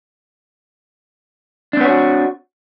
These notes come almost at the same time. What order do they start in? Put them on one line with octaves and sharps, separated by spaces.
D4 C4 B3 C#5 F#4